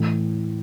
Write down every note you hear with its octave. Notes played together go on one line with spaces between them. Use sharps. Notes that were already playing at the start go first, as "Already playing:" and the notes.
Already playing: A2 E3